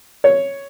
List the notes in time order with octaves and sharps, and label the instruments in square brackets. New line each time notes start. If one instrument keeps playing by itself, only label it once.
[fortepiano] C#5